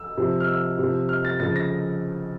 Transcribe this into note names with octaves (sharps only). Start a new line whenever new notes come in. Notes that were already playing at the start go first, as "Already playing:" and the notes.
Already playing: E6
C3 F3
F6
E6
C3
F3
F6
A6
C#3 F3 A6
A#6